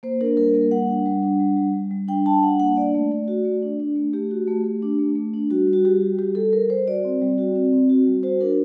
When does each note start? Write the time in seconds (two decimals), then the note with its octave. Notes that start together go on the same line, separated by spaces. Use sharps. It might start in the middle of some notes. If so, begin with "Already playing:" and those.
0.03 A#3 C5
0.20 D4 A#4
0.37 G3 A#4
0.54 A#3 A#4
0.71 G3 F#5
0.89 D4
1.06 G3
1.23 D4
1.40 G3
1.56 G3
1.74 G3
1.91 G3
2.08 D4 G5
2.26 D4 A5
2.43 G3 F#5
2.60 A#3 F#5
2.76 D4 D5
2.94 A3
3.12 A3
3.28 F#4
3.45 A3
3.62 D4
3.80 D4
3.96 A3
4.13 A3 G4
4.31 F#4
4.48 A3
4.64 A3
4.82 D4
4.99 A3
5.15 A3
5.34 D4
5.50 G3 F#4
5.67 G3
5.73 F#4
5.85 G3 G4
6.02 F#4
6.18 G3 G4
6.35 G3 A4
6.52 G3 A#4
6.69 G3 C5
6.87 F#4 D5
7.05 C4
7.22 G3
7.38 F#4
7.55 C4
7.73 C4
7.89 F#4
8.07 G3
8.23 F#4 C5
8.40 D4 A#4